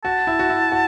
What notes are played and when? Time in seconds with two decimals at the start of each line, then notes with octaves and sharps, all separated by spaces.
0.04 F#4 A5
0.27 E4
0.39 F#4
0.49 E4
0.72 F#4